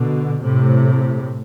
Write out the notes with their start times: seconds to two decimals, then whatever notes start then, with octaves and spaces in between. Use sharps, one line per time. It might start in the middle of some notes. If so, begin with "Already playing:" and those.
Already playing: B2 D3
0.43 A2 C3